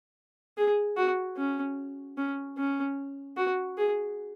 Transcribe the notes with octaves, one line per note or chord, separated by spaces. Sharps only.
G#4
F#4
C#4
C#4
C#4
F#4
G#4